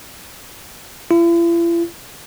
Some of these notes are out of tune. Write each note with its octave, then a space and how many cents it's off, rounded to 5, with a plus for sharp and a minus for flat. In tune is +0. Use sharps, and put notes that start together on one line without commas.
E4 +45